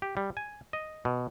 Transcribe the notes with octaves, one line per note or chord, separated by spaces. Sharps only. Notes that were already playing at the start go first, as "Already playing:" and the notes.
G4
G3
G#5
D#5
B2